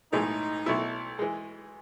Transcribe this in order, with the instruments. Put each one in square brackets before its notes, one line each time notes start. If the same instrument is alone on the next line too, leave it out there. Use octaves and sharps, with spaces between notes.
[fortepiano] B1 A2 E3 G#3 [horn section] D#4
[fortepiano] B1 B2 A3 E4
E3 G#3